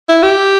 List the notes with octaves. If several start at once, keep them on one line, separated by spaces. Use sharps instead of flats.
E4
G4